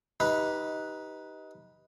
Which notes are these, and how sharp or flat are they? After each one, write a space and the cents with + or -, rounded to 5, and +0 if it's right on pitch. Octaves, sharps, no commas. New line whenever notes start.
D#4 +15 G4 +0 B4 -5